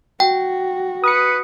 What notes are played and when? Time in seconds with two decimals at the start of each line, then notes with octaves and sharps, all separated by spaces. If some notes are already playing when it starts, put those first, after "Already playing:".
0.20 F#4 G5
1.04 B4 D#6 C#7